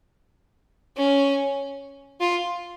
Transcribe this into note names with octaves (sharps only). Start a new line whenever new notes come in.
C#4
F4